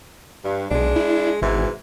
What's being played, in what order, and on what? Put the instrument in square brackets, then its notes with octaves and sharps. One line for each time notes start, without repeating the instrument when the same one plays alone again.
[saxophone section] G2
[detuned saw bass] B1 [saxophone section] G#3 D4
[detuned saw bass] E4
[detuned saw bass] G#1 [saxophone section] G#2 B2 E3